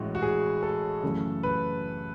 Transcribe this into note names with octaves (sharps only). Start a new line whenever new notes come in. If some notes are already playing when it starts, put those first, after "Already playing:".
Already playing: A1 A2 G#3 F#4
F#4
G#4
A4
F#2 C#3 E3 A3
B4